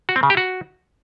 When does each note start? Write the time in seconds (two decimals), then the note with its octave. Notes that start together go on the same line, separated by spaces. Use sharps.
0.09 F#4
0.16 C4
0.23 C#3
0.30 G4
0.37 F#4